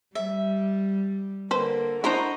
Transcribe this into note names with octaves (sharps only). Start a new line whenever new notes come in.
G3 E5
D3 A#3 B4 C5
D4 E4 F#4 C5 D#5 A#5 B5